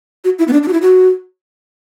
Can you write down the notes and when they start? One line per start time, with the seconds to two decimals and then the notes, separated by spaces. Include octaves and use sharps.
0.24 F#4
0.39 E4
0.48 B3
0.53 D4
0.63 D4
0.68 F#4
0.73 E4
0.82 F#4